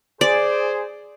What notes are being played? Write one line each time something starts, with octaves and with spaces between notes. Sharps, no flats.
G#4 C5 D5